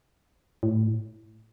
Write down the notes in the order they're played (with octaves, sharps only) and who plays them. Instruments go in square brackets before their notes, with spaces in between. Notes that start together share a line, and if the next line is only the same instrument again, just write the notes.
[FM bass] A2